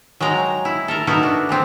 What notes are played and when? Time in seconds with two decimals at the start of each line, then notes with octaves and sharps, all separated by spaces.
0.20 F#3 G#3 G5 A#5
0.65 E4
0.88 A4 A#4 A#5
1.07 B3 D#4 E4 F#4 A4 A#4
1.23 D4
1.49 E3 B3 C4